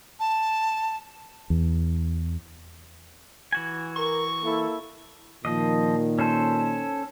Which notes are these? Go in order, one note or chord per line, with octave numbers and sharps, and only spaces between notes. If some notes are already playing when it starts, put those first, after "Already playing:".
A5
E2
E3 F#4 G#5
A#4 C#6
A#3 E4 A4
A#2 D#3 F3 D#5
C#4 A4 C5